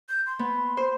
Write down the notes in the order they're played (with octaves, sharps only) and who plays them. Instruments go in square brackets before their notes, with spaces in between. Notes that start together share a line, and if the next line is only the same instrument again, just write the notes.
[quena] G6
C6
[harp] B3
C5